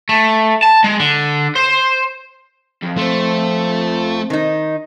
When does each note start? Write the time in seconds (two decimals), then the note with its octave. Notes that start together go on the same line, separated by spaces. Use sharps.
0.09 A3
0.63 A5
0.84 G#3
1.00 D3
1.56 C5
2.83 F2
2.98 A3 C4 C5
4.30 D#3 D#4